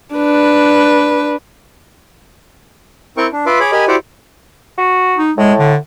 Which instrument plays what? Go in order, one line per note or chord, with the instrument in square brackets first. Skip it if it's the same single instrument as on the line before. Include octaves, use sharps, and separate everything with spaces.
[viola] D4 B4
[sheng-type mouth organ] C4 E4 A#4 G5 C#6
D4
F4 B4 E5 C6 D6
G#4 C#5 B5 D6
G4 A#4 D#5 G#5 B5
E4 F#4 G4 C5 D5 F#5
[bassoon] F#4
[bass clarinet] D#4
[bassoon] A2 [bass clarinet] G#3
[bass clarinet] D3